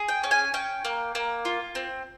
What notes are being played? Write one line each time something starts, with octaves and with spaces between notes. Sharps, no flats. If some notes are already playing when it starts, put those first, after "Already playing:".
Already playing: G#4
G5
C#4
G#5
C#4 G5
A#3
A#3
F4
C4